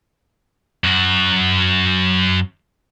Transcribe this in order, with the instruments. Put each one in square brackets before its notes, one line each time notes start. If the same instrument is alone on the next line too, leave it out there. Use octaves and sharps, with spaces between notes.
[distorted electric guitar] F#2 F#4